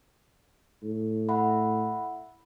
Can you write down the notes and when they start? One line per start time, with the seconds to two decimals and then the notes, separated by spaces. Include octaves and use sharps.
0.82 A2
1.29 E5 F#5 B5